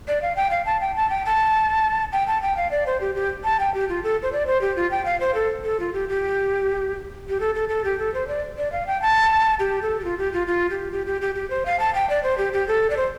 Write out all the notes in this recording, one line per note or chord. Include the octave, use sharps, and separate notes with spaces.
D5
F5
G5
F5
A5
G5
A5
G5
A5
G5
A5
G5
F5
D5
C5
G4
G4
A5
G5
G4
F4
A4
C5
D5
C5
G4
F4
G5
F5
C5
A4
A4
F4
G4
G4
G4
A4
A4
A4
G4
A4
C5
D5
D5
F5
G5
A5
G4
A4
G4
F4
G4
F4
F4
G4
G4
G4
G4
G4
C5
F5
A5
G5
D5
C5
G4
G4
A4
D5
C5